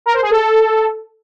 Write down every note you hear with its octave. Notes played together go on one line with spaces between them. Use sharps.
A#4
C5
G#4
A4